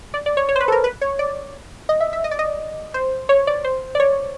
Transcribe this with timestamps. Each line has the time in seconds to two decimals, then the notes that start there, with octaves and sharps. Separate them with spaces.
0.14 D5
0.26 D5
0.37 C#5
0.49 C#5
0.56 C5
0.60 B4
0.68 A4
0.72 A#4
0.84 B4
1.01 C#5
1.19 D5
1.89 D#5
2.00 E5
2.13 E5
2.24 D#5
2.31 D5
2.39 D#5
2.94 C5
3.29 C#5
3.47 D5
3.65 C5
3.95 D5
4.00 C#5